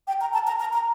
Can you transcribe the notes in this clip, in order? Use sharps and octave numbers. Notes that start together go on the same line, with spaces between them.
G5
A#5
A5
A#5
A#5
A#5